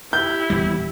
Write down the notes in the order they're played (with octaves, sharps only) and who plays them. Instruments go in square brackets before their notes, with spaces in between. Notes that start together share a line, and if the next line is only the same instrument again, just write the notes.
[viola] E4 G4 [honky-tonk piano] G6
[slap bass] D#1 E2 G3